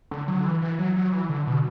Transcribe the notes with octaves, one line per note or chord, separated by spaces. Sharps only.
D3
F#3
D3
E3
E3
F#3
F#3
E3
D3
B2